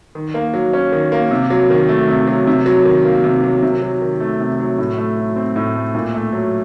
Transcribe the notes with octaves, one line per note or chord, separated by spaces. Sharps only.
D#3
A#3
F#3
C#4
D#3
A#3
C3
F#3
D#3
A3
C3
F#3
C3
F#3
D#3
A#3
C3
F#3
C3
F#3
D#3
A3
C3
F#3
A2
A3
F#3
C4
A2
A3
A#2
A3
F#3